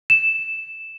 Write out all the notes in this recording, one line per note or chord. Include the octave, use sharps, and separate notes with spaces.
E7